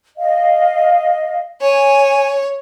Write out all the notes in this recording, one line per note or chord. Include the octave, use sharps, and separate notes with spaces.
D#5 F5
C#5 G#5